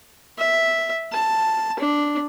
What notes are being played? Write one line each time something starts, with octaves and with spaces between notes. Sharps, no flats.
E5
A5
D4